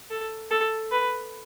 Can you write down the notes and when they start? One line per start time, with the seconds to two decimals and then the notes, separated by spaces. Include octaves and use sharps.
0.10 A4
0.51 A4
0.91 B4